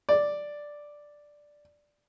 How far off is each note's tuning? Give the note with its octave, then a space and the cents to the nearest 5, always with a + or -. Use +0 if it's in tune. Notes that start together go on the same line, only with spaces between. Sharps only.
D5 +0